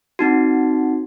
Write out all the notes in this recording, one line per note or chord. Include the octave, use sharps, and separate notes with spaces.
C4 D#4 F#4